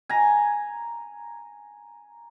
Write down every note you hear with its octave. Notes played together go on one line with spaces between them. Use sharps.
G#5 A#5